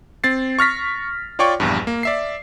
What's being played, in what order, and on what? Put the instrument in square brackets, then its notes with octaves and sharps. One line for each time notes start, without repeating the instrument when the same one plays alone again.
[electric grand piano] C4 A6 C7
C#6 F6 A#6 B6
F4 C#5 D5 G5 C#6
A#1 E2 G2
A#3
D5 E5 C7